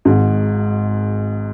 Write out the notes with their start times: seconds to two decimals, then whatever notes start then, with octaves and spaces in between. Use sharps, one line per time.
0.05 G#1 G#2